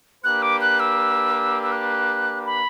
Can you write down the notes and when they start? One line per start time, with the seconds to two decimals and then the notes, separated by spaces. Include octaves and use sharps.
0.24 A#3 D4 G4 B4 F#6
0.42 D6
0.61 F#6
0.80 E6
1.63 E6
1.72 F#6
2.46 B5